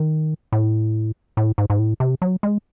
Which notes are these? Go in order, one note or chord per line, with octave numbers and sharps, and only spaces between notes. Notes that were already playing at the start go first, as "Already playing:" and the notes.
Already playing: D#3
A2
A2
G#2
G#2
A2
C3
F#3
G#3